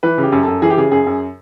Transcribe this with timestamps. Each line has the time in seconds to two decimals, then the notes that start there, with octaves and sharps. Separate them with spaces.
0.03 E3 B4
0.18 C#3
0.23 G4
0.32 F#2
0.43 F#2 A4
0.62 E3 G#4
0.70 G4
0.77 C#3 G#4
0.91 F#2 G#4
1.06 F#2